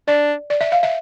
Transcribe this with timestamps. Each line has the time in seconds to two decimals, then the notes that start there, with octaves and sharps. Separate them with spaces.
0.08 D4 D5
0.50 D5
0.61 E5
0.72 F5
0.83 E5